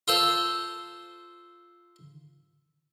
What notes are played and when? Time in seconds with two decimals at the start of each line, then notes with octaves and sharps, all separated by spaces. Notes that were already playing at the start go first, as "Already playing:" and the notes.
0.08 F4 A4 C5